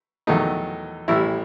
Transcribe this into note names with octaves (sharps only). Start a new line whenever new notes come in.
E2 D#3 F#3 A3 D#4
A1 A2 G3 E4